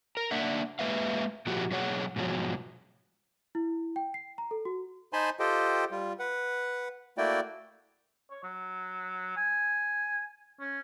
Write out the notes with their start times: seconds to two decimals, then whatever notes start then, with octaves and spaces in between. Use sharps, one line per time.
0.17 A#4
0.31 A#3 D4 E5 F#5
0.79 G#3 A#3 B4 E5 F5
1.46 A#2 F3 A3 F#4 G4
1.71 B2 F#3 G#4 C#5 F#5
2.16 G#2 B2 F3 F#3
3.55 E4
3.96 G5
4.14 C7
4.38 A#5
4.51 A4
4.65 F#4
5.13 D#4 C5 G#5 A5 B5 C6
5.40 F4 G4 A4 C5 D#5 G5
5.91 G3 F4
6.19 B4 F#5
7.18 A3 A#3 E4 F#4 D5 G5
8.31 C#5
8.44 F#3
9.37 G#5
10.60 C#4